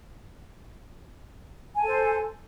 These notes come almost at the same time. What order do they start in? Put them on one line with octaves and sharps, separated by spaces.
G#5 A5 A4 C5